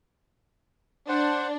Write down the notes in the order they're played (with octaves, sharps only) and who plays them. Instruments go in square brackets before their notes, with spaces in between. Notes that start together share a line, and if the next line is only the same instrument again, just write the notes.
[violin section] D4 [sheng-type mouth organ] C5 F#5